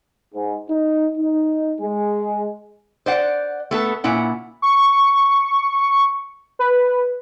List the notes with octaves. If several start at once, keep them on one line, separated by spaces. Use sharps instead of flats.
G#2
D#4
D#4
G#3
C5 D5 F#5
A3 B3 A4
A#2 C#4 E4 F#5
C#6
B4